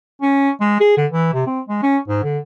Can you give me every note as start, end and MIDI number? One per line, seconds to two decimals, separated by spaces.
0.22 0.50 61
0.60 0.78 56
0.80 0.95 68
0.97 1.06 50
1.11 1.33 52
1.33 1.42 48
1.47 1.61 60
1.69 1.82 56
1.82 1.98 61
2.08 2.21 44
2.24 2.38 50